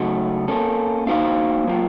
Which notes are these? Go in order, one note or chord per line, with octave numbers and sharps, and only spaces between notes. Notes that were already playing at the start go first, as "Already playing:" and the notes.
Already playing: C#3 F#3 A3 D#4 F#4
A#3 C#4 A4
A#3 D#4 F#4 C5 F5
F#3 A#3 F4